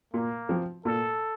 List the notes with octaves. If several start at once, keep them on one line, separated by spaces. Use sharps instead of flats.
A#2 A#3
F3 C4
A#2 A4